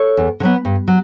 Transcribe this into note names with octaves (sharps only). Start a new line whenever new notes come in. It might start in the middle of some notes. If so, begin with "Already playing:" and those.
Already playing: A4 C#5
E2
D3
F#3 B3
G2
F#3